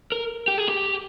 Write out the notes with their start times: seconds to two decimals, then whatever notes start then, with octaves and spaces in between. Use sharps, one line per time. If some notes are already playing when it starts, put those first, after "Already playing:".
0.12 A#4
0.48 G4
0.58 G#4
0.69 G4